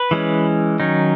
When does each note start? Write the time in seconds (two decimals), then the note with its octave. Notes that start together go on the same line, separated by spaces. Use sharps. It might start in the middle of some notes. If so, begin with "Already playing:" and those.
Already playing: B4
0.11 E3 G#3 C#4
0.80 D#3 F#3 C#4 D#4